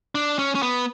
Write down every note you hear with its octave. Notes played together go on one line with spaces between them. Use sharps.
D4
C#4
C#4
B3